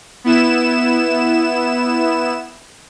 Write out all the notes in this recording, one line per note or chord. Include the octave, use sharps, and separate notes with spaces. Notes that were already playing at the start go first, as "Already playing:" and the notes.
B3 E4 E7